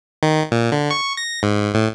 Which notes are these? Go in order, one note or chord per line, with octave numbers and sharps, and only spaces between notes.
D#3
A#2
D3
C#6
A#6
G#2
A2